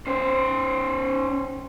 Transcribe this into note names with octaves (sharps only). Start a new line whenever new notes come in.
C#4 C5